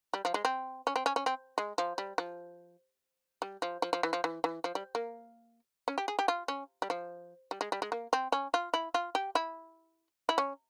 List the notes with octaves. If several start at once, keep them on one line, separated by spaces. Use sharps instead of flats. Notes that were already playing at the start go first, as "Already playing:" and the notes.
G3
F3
G#3
C4
C#4
C4
C#4
C#4
C4
G#3
F3
G3
F3
G3
F3
F3
F3
E3
F3
E3
E3
F3
G3
A#3
C#4
G4
G#4
G4
F4
C#4
G3
F3
G3
G#3
G3
G#3
A#3
C4
C#4
F4
E4
F4
G4
E4
E4
C#4